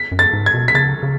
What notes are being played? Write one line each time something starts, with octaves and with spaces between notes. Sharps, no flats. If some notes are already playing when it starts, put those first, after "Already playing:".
Already playing: B6
F#2
A6
G#2
G#6
B2
B6
C#3 A6
C#3